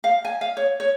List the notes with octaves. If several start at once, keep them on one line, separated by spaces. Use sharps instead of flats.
F5
G#5
F5
C#5
C#5